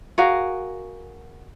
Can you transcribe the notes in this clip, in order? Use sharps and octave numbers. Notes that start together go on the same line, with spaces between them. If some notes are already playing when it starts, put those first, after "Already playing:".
F#4 G#4 A#4 F5